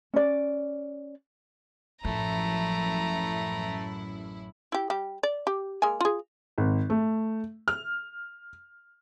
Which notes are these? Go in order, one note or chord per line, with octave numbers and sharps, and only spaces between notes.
C#4 D5
A1 F#2 F3 A3 E4 A#5
E4 G4
G3 G4
D5
G4
G#3 A#3 G#5
F4 G#4
G#1
A3
F6